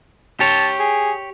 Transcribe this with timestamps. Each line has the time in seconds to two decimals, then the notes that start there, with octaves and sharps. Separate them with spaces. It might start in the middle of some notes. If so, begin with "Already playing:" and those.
0.40 G4 C#5 A5
0.79 G#4